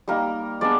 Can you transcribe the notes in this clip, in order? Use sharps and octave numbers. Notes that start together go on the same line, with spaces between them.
G3 A#3 D#4 A#4
G#3 B3 D4 D5